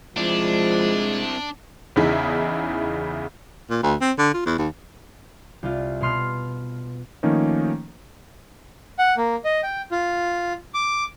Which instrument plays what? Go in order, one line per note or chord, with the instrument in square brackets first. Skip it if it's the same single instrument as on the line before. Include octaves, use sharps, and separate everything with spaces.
[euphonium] F3 [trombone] G#3 [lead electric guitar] C4 E4 [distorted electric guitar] D4
[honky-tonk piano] E2 C#3 D#4 E4 G#4 E5
[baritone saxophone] A#2
D2
C4
D3
F4
E2
D#2
[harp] C2 F4
B2 B3 C6 F6
[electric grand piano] D#3 F3 A3 A#3 C#4 D#4
[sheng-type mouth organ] F#5
A#3
D#5
G5
F4
D6